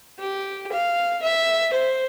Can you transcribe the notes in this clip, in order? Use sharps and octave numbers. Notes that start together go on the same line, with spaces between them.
G4
F5
E5
C5